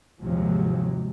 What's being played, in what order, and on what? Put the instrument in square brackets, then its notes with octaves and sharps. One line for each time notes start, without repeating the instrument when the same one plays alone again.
[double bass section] D#2 G#2 C3 F3 F#3 G#3